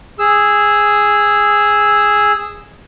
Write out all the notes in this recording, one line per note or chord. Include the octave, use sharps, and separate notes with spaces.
G#4 E6